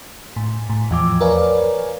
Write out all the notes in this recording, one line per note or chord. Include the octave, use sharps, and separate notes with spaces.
A2
A2
E2 F3 D6
A#4 B4 C#5 D5 F5 G#5